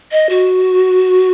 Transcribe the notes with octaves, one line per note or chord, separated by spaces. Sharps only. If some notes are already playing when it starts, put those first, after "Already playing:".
D#5
F#4